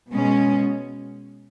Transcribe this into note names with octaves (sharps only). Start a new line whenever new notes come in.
B2 G#3 C#4